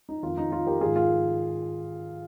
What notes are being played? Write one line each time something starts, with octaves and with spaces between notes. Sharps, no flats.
D#4
F2 D#3 F4
D#4
F4
G4 A#4
G#2 D#3 F4 G#4
F4